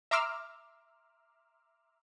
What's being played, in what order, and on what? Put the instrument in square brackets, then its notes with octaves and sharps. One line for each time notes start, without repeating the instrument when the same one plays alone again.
[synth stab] E5 A#5 C6 D6 E6 F6